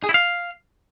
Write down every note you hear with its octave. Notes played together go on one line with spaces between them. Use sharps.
G#4
E4
F5